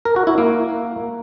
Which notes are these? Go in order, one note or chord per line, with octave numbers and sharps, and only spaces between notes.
A#4
F#4
E4
A#3